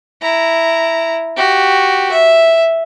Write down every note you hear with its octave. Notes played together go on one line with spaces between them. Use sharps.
E4 A#5
F#4 G4
E5